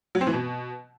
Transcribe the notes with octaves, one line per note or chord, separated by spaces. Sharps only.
F#3
C4
E3
B2